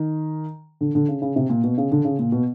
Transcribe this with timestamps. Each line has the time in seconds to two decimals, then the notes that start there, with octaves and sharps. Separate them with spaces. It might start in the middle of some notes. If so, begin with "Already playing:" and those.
Already playing: D#3
0.81 D3
0.95 D3
1.08 C#3
1.22 C#3
1.36 C3
1.49 A#2
1.64 B2
1.78 C#3
1.91 D3
2.05 C#3
2.19 A#2
2.32 B2